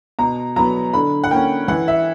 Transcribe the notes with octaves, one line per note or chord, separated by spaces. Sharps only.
B2 A#5
F#3 B3 A#5
D3 B5
F#5
A#3 C#4 G5
E3 F#5
E5